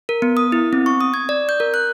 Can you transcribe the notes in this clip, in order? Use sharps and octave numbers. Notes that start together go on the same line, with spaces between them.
A#4
B3
D#6
E4
C4
C#6
D#6
G#6
D5
G6
A#4
F#6